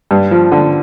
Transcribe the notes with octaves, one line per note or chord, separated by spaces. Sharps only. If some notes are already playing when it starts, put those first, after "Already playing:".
G2
F3
D3